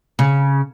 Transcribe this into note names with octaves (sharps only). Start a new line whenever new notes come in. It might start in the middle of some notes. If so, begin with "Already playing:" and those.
C#3